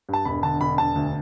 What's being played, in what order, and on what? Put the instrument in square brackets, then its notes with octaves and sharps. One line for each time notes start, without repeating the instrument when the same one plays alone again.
[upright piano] G2 A5
E1 B5
D3 A5
E1 B5
E1 A5
D2